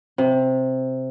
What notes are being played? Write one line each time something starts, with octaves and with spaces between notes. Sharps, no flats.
C3